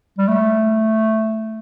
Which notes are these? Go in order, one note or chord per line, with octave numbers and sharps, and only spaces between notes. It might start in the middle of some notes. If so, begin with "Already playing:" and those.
G3
A3